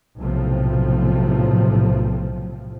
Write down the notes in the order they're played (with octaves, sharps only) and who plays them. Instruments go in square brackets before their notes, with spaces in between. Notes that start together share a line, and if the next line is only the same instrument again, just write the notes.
[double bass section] B1 A2 C3 F3